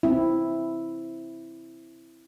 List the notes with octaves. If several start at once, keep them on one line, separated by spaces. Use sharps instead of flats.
C4 E4